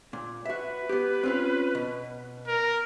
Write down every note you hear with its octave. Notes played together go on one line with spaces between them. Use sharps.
A#2
F#4 B4 E5
B3 G4
C4 C#4 F4
B2
A#4